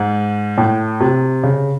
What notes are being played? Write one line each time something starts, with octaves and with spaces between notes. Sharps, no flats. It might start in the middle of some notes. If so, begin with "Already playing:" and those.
Already playing: G#2
A2
C3
C#3